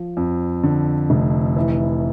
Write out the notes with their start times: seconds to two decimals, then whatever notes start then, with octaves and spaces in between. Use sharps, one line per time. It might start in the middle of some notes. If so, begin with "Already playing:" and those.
Already playing: F3
0.17 F2
0.63 D3
1.10 F1
1.56 E3